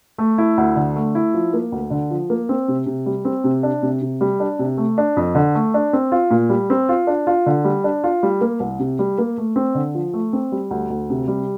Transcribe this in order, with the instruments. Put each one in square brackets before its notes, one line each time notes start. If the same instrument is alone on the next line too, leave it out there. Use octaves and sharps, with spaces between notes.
[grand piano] A3
E4
D2
D3
A3
E4
F3
A#3
D2
D3
F3
A#3
C4
C3
C3
G3
C4
C3
D4
C3
C3
G3
D4
C3
A3
D4
F2
D3
A3
D4
C4
F4
A#2
G3
C4
F4
D4
F4
D3
G3
D4
F4
G3
A#3
C2
C3
G3
A#3
A3
C4
D3
F3
A3
C4
G3
D2
D2
C3
G3